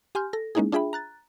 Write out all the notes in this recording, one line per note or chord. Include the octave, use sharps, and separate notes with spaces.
G4 G#5 C6 F6 G6
A4 A#6
G#3 A#3 C#4 D#4 E4 G#4
D4 F4 G#4 E5 G5 B5
A#5 F#6 A6